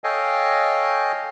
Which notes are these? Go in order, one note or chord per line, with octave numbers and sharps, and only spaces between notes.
A4 C#5 D#5 F5 G5 G#5